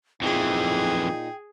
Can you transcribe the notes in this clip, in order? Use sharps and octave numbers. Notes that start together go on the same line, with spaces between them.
F2 A#2 E3 D#4 G#4 G5